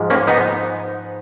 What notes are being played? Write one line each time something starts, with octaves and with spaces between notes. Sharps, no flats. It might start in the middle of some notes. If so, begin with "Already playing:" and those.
Already playing: G#2 F3 G#3
A#3 C#4
B3 D#4